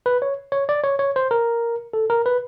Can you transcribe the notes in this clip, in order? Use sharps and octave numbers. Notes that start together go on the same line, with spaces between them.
B4
C#5
C#5
D5
C#5
C#5
C5
A#4
A4
A#4
B4